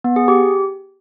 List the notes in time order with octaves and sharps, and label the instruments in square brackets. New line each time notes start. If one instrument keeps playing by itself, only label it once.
[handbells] B3
G#4
G4